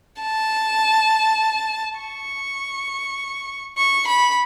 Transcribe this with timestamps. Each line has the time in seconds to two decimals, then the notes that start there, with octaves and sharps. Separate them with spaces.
0.22 A5
1.99 C#6
3.77 C#6
4.07 B5